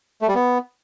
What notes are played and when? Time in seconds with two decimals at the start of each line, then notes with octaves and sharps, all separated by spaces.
0.22 A3
0.28 G3
0.35 B3